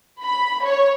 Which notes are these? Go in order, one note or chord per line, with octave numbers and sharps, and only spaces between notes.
B5
C#5